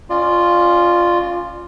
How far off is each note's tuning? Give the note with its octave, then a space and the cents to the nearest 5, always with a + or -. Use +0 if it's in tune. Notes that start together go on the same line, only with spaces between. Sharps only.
C#4 +0 F4 +0 D5 +35